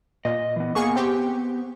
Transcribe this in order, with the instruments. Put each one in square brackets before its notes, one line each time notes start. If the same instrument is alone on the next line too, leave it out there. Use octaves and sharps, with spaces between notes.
[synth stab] A#2 [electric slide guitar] D#5
[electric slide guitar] E3 B3
[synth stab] A#3 G#4 C#6 [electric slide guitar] B3
[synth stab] C4 G4